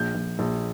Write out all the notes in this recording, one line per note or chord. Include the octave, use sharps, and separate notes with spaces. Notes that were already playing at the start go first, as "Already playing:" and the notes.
Already playing: A#1 G6
A#1
A#1